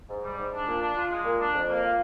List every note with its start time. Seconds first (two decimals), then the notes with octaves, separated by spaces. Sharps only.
0.09 G#2
0.22 G3
0.38 G#2
0.52 D4
0.67 A#2
0.81 D4
0.96 F4
1.10 G#3
1.24 A#2
1.39 D4
1.54 F2
1.69 A#3
1.83 F4